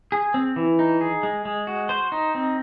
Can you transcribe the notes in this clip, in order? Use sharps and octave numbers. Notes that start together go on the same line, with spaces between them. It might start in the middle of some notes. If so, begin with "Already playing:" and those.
G#4
C4
E3
D#4
G#4
G#3
G#3
F#4
C5
D#4
C4